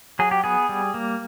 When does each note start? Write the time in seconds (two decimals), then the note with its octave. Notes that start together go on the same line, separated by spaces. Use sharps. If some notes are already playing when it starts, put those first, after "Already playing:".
0.19 F#3 G#4
0.31 G4
0.44 B3 G#4
0.69 G3
0.94 A#3